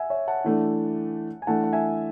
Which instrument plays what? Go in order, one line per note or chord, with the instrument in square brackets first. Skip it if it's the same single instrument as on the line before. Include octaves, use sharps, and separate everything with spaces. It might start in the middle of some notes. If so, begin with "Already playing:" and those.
Already playing: [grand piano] E5 F#5 G#5
C#5 E5
F#5 A5
[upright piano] E3 A3 D4
[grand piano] G#5
[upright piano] E3 A3 D4 [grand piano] F#5 A5
[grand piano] F#5
E5 G#5